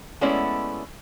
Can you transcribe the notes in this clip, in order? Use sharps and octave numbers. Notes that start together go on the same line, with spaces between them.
G#3 A3 B3 C#4 E4 D5